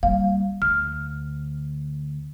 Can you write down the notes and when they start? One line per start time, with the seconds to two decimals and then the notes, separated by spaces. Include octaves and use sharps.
0.03 G3 A#3 F5
0.62 D2 F6